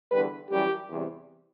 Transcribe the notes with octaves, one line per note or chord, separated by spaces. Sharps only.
E2 D3 G3 B4
F#2 E3 G3 G4
E2 C3 E3 G3